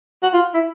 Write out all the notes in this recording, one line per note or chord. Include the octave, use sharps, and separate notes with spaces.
F#4
F4
E4